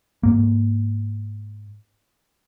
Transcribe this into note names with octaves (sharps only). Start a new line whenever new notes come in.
G#2 A#3